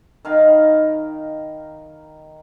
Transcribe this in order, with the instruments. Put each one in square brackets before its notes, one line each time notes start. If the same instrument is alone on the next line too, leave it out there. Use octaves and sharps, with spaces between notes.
[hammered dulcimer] D#3 A#4 F5 B5